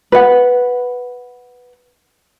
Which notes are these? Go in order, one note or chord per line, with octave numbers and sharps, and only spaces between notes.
B4 F#5